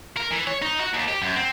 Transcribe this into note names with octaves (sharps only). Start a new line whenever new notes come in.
A#4
E3
C#5
D#4
F#4
D#2
G4
F#2
C4